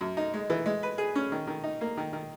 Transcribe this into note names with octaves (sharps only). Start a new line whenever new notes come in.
F#2
D#4
G#3
E3
G#3
B4
G#4
C#4
D#3
D#3
D#4
A#3
D#3
D#3